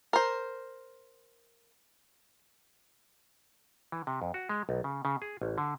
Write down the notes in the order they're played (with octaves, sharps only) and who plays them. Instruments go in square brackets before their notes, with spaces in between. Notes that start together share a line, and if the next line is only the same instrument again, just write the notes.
[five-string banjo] A#4 C5
[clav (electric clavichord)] E3
C3
F2
F#4
G#3
B1
C#3
C#3
G#4
A1
D3